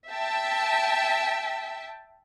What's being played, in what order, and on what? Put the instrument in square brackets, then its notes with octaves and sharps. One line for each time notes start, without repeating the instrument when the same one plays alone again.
[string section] E5 G5 A5